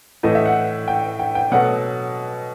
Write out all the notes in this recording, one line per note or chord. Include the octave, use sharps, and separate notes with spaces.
A2 E3 A3 D#5
E5
F#5
G5
G5
G5
B2 F#3 A3 F#5